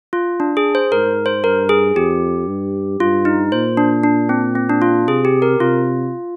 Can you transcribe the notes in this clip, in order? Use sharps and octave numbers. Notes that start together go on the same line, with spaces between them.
F4
D4
G#4
C5
G#2 A#4
C5
G2 A#4
G#4
F2 G4
G2
G2 F4
D#4
A#2 C5
D4
D4
C4
C4
D4
F4
C3 G#4
G4
A#4
C3 F4